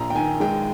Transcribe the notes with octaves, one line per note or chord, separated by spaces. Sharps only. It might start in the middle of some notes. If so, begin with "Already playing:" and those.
Already playing: A#1 A#5
G5
D#3 G#5
G#3 G5